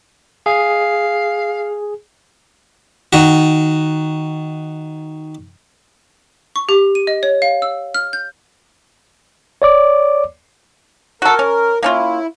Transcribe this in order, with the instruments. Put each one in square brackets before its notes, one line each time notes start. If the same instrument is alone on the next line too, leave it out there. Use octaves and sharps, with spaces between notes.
[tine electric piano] G#4 [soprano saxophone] F5
[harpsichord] D#3 F#4
[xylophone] C#6
G4
D#7
D#5
C#5
F5
E6
F6
G6
[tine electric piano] C#5 D5 D6
[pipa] F#4 A4 [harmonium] A#4
[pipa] C#4
[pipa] A#3 C#4 F4 [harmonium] E4